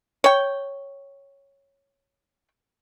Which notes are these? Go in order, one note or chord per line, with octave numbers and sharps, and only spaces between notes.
C#5 G5